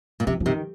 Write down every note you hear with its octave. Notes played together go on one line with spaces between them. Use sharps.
A#2
C3 F3
F3
C3 D#3